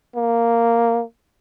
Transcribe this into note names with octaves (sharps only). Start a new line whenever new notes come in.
A#3